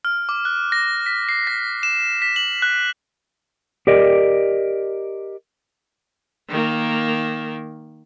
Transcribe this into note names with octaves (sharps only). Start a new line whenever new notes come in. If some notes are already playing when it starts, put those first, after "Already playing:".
F6
D6
F#6
A#6
B6
C7
A#6
E7
B6
F#7
F#6
G4 A#4 D5 D#5
D#3 A#3